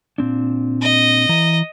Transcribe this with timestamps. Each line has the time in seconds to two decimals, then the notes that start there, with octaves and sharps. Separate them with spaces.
0.18 A#2 C4 D4
0.82 D#5
1.29 E3 A#5